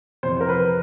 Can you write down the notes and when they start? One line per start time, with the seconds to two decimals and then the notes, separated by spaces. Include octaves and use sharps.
0.23 F2 C3 E3 C5
0.41 A#4
0.49 B4